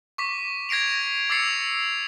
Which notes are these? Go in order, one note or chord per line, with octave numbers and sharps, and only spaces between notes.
C#6 D6 B6
G#6 A#6 C7 D7 F7
D6 E6 A6 C7 C#7 F7